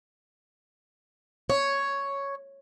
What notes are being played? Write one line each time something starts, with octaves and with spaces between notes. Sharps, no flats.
C#5